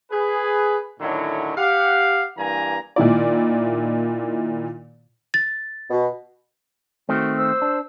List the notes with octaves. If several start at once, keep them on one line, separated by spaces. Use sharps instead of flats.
G#4 B4
A2 D3 D#3 F#3 C#4 E4
G4 F5 F#5
G2 E3 A#3 G#5 A#5
A#2 D#3 E4 D5
A6
B2
D#3 A3 C4 F#4
C5 E6
D4